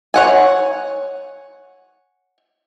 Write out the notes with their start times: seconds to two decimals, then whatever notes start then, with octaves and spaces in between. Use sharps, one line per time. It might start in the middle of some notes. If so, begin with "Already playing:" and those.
0.14 C#5 F#5 G#5